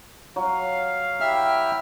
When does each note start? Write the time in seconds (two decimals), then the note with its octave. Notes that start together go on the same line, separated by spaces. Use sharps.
0.36 F#3 F5
1.20 E4 G4 E5 G5 F6